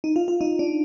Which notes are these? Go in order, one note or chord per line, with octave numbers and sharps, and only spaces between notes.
D#4
F4
F4
D#4
D4